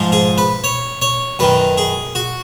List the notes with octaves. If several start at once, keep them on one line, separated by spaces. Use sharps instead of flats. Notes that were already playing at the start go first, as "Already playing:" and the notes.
Already playing: G#2 F3
G#4
B4
C#5
C#5
F#2 D#3 B4
G#4
F#4